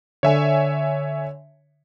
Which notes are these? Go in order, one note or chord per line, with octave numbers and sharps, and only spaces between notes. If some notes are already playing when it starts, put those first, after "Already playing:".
D3 C#5 E5 G#5